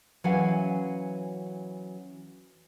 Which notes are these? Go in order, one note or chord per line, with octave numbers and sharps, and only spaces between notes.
E3 F#3 C#4 F5 F#5 G#5